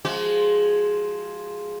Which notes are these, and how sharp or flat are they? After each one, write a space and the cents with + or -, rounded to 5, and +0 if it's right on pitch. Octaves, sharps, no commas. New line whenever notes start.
F3 +0 G#3 +0 F#4 +35